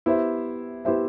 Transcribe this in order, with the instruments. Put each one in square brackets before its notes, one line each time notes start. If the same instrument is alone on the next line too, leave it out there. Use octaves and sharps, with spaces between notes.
[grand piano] B3 E4 G4 C5 E5
B3 E4 G4 C5 E5